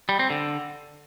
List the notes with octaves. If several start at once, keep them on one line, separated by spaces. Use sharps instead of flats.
G3
C4
D3